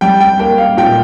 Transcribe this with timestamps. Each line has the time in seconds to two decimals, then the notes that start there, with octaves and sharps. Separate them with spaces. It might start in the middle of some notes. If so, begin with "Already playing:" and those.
0.01 G3 G5
0.20 G5
0.39 A#3 G5
0.58 F5
0.77 A#2 G5